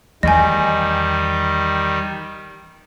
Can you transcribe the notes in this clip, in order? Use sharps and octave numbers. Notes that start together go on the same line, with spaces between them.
E2 D#3 G3 D#5 G#5